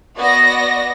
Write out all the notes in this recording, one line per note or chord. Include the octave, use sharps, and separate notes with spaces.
B3 F#4 D5 D#5 A#6